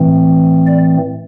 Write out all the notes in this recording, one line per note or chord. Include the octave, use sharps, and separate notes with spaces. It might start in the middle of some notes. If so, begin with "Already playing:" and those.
Already playing: A2 E3 A3 C4
D5